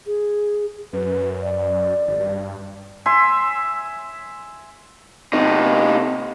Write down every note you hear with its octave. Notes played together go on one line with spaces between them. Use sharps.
G#4
F#2 B4
D5
G#1
G2
E5 G#5 C6
C3 D#4